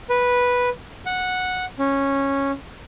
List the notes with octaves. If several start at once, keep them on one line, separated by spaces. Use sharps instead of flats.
B4
F#5
C#4